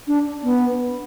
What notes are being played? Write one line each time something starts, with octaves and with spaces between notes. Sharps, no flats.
D4
B3